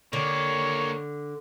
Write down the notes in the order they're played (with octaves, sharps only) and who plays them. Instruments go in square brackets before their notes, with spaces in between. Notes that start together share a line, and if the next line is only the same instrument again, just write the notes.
[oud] D3 [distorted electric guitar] A#3 G4 [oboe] C#5